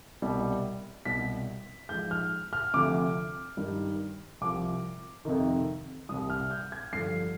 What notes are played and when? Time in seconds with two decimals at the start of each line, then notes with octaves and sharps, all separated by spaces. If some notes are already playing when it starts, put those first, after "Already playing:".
0.22 C2 B2 G3
1.05 C2 B2 G3 B6
1.89 G#2 F3 G6
2.11 F6
2.53 F6
2.74 D2 C3 F3 D6
3.57 G2 D#3 G3
4.41 C2 C3 F3 D6
5.25 F2 C3 D#3
6.09 C2 C3 G3 D#6
6.30 F6
6.51 G6
6.72 G#6
6.93 G2 D3 F3 C7